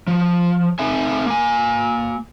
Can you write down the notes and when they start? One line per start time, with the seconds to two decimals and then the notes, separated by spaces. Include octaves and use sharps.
0.07 F3
0.79 C4 D#4 A4 E5 G#5
1.26 A#3 G#5